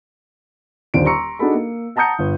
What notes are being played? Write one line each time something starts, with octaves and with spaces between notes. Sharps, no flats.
D#1 D#2 D3 C5 D5 D7
A#5 C6 C#6 E6 C#7
D4 D#4 F#4 G#4 A4 B5
A#3
F#5 A5 A#5 D#6 G6 C#7
G1